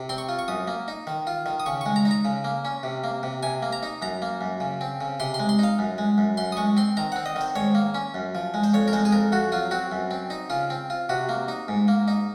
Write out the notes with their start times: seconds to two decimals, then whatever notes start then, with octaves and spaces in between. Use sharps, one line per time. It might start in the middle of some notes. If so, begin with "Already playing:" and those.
Already playing: C3
0.09 C4 C6
0.18 C#6
0.29 F4
0.39 C#6
0.48 F#2 D#6
0.67 A#3
0.88 D#4
1.07 D#3
1.27 F4
1.46 D#3
1.60 D#6
1.66 C#3 C#6
1.81 G#3 C#6
1.96 A#5
2.05 D#4
2.11 A#5
2.25 C#3
2.44 A#3
2.65 C#4
2.83 C3
3.04 A#3
3.23 C3
3.43 C3 G#5
3.62 A#3
3.73 A#5
3.83 D#4
4.02 F#2 A#5
4.22 A#3
4.41 F#2
4.60 C#3
4.81 C4
5.01 C#3
5.20 C3 C6
5.34 C6
5.39 G#3
5.49 C6
5.59 D#4 F5
5.79 F#2
5.98 G#3
6.18 F#2
6.37 F#2 C6
6.52 D#6
6.57 G#3 C#6
6.77 C4 C6
6.97 D#3 A#5
7.12 C4 F#5
7.26 D#5
7.36 D#3 C5
7.55 G#2 C#5
7.75 A#3
7.94 C#4
8.14 F#2
8.35 F3
8.54 G#3
8.63 C5
8.74 F2 C#5
8.88 A#4
8.93 G#3 C5
9.05 G#4
9.12 F2 A#4
9.32 F2 F#4
9.52 F#3 F4
9.71 C4 F#4
9.92 F#2
10.11 C4
10.30 D#4
10.50 C#3 F4
10.70 C4
10.90 F4
11.09 C3 F#4
11.29 A#3
11.48 D#4
11.68 G#2
11.88 A#3
12.08 D#4